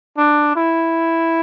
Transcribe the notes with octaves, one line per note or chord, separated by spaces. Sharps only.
D4
E4